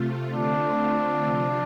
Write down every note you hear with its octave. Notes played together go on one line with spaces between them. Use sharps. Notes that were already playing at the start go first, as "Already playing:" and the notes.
Already playing: C3 A3 F4
D3 A3 C4 D4 F4
C3 F3 C4 F4